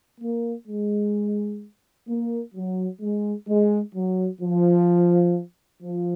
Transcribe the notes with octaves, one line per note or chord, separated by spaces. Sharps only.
A#3
G#3
A#3
F#3
G#3
G#3
F#3
F3
F3